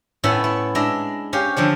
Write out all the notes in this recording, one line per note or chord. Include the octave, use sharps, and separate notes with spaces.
A2 B3 C#4 E4 A4 B5
E4
G#3 D4 E5 A#5
C#4 G4 F5
D3 F3 D4 C#5